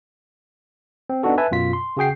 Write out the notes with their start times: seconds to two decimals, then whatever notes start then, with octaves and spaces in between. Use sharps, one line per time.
1.10 C4
1.23 B3 D4 D#4 F#4 A4
1.38 B4 E5 G#5 A5
1.51 F#2 B2 F4 B6
1.73 C6
1.97 C#3 F#4 G#4 G5 C7